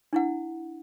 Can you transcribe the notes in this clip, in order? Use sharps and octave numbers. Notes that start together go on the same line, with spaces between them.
D4 E4 F#5